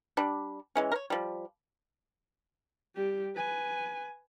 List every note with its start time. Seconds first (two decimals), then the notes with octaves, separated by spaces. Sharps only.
0.17 G3 D4
0.76 E3 G#3 C#4
0.92 A#4 C#5
1.10 F3 G3
2.95 G3 G4
3.35 B4 G#5